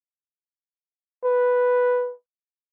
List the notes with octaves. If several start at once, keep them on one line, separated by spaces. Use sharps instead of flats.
B4